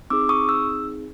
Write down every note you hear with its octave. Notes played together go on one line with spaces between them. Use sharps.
C4 D#4 G#4 D6 E6
C#6 D#6
E6